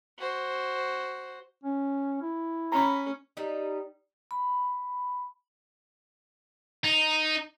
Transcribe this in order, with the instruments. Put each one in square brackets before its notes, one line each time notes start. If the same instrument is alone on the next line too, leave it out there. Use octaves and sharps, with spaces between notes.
[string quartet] F#4 C5
[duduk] C#4
E4
[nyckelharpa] C#4 [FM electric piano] A#5 B5
[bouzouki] G3 D#4
[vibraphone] B5
[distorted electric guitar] D#4